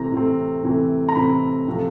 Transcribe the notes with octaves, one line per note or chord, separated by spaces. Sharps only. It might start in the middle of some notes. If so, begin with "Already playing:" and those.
Already playing: C3 E3 A3 C4 A#5
C3 E3 A3 C4
C3 E3 A3 C4
A#5
C3 E3 A3 C4 B5
C3 F3 A3